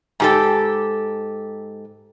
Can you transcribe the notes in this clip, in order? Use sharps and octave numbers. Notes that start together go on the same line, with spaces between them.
G#2 G4 A4